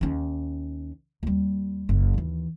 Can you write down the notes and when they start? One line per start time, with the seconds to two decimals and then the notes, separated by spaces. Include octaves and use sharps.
0.01 D#2 C#4
1.23 D#2 G3
1.89 F#1
2.14 D#2 E3